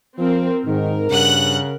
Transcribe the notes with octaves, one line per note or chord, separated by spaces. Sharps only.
F3 C4 A#4
G#2 D#3 A#4
G2 C#3 F#5 F#6